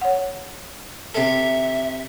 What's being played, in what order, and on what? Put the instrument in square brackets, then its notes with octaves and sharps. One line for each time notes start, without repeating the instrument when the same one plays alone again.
[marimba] C#5 F#5
[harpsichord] C3 A4 [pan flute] E5